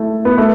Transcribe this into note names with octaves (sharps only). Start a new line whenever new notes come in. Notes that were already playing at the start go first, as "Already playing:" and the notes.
Already playing: A3 E4
B3
A3